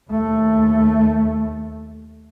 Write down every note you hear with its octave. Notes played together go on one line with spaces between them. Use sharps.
D#2 A3